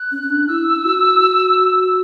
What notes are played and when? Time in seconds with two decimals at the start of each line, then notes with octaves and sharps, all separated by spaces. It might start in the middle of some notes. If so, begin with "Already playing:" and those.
Already playing: F#6
0.12 C#4
0.23 C#4
0.30 D4
0.48 E4 E6
0.85 F#4